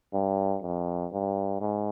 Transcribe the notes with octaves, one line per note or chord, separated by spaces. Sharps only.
G2
F2
G2
G#2